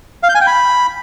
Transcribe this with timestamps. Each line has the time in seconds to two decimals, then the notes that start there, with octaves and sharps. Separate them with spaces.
0.23 F5
0.29 G6
0.35 G#5
0.41 G5
0.47 B5